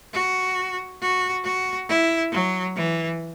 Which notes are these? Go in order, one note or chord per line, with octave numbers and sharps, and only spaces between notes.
F#4
F#4
F#4
E4
F#3
E3